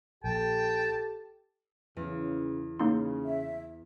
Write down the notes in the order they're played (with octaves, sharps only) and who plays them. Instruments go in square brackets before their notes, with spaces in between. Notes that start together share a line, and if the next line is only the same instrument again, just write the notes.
[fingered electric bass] A#1 [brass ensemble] G4 A4 [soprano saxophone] G5 [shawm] A5
[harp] E2 [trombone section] C#3
[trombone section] C#3 [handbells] A#3 D#4 C6
[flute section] E5